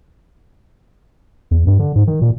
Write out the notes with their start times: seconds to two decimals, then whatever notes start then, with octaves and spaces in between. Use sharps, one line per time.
1.51 E2
1.67 G2
1.79 D3
1.95 G#2
2.07 D#3
2.21 A#2